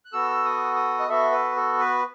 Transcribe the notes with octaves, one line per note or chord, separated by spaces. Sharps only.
F#6
B3 F#4 A4 E6
D#6
D#6
D#5
B3 F#4 A4 E5
B4
A4
B4